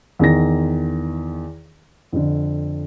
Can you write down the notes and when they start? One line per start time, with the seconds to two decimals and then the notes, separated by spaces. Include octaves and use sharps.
0.19 E2 D#3 A#6
2.13 F2 D3